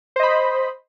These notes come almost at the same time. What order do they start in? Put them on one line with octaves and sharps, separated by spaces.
C5 D#5 B5